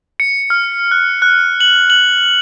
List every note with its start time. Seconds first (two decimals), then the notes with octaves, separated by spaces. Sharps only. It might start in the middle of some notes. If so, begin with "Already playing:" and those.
0.20 C#7
0.50 F6
0.91 F#6
1.22 F#6
1.60 F#7
1.90 F#7